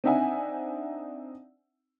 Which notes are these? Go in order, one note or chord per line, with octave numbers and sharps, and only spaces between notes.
C4 D4 D#4 E5 F#5 G#5